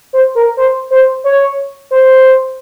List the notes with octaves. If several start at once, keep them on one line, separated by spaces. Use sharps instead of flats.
C5
A#4
C5
C5
C#5
C5